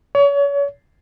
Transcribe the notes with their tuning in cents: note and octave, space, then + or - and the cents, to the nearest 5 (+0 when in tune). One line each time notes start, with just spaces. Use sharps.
C#5 +35